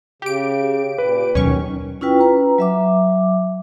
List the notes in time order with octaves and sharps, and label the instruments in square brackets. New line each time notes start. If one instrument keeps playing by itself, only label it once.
[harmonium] C#3 [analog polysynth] G4 D7
[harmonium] A#2 [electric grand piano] B4
[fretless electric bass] D#2 B2 F#3 [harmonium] D#3 [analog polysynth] C#4 C#6
[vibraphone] C#4 E4 F4 B4 G5
B4 A#5
F#3 E5 D6